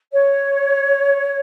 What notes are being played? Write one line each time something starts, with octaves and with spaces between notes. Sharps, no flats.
C#5